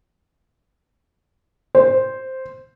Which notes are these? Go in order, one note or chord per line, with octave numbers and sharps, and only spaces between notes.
C5